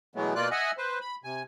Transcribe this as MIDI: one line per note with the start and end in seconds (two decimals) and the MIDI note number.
0.16 0.34 47
0.16 0.34 52
0.16 0.34 54
0.16 0.34 56
0.16 0.34 57
0.16 0.34 59
0.35 0.49 47
0.35 0.49 58
0.35 0.49 65
0.35 0.49 74
0.35 0.49 90
0.51 0.71 75
0.51 0.71 76
0.51 0.71 78
0.51 0.71 80
0.78 0.99 71
0.78 0.99 72
1.01 1.15 83
1.24 1.43 48
1.24 1.43 80